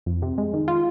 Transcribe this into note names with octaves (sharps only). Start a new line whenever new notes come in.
F2
C3
G#3
D#3
F4